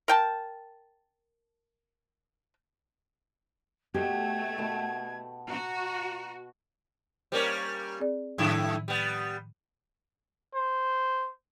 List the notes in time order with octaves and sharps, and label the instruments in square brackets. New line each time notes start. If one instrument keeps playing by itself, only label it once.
[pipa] A#4 G5 A5
[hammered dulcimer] B2 G5 [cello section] A3 [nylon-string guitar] G4 [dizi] G#6
[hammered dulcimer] B2 A5 B5
[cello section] F#4 [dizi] A#5
[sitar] G3 A#3 C#4 [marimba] A#4 C5
[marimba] C4 G#4 D5
[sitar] F#2 A3 E4 [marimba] A2 D#3 F3
[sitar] G3 B3
[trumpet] C5